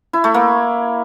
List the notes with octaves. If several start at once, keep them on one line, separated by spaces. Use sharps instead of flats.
E4
A3
A#3